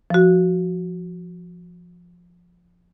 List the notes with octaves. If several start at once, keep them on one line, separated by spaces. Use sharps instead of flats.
F3 F#4